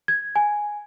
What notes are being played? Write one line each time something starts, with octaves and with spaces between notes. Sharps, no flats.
G#6
G#5